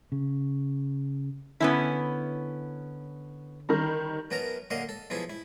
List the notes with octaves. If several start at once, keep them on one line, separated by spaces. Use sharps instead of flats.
C#3
D3 B3 C#4 E4 B5
D#3 G3 A#4 C5
F#2 B3 A#4 A5 A#5
F#2 D3 A#3 D#5 F5 F#5
A4
B1 F3 E4 G#4 A4
E4